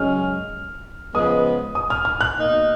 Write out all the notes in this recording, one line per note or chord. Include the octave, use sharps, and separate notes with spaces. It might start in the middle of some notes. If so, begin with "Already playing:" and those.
Already playing: F#2 C#3 G#3 C#4 F6
C#3 F3 G#3 B3 D#6
D#6
F6
F6
F#6
B2 A#3 D#4